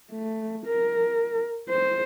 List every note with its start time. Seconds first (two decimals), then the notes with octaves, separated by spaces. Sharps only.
0.12 A3
0.66 A#4
1.69 C5